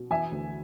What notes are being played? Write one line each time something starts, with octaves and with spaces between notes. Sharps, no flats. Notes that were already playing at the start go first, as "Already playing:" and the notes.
Already playing: B2
E3 E5 G#5
D2